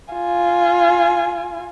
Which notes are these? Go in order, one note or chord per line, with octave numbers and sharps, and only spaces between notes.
F4 G#5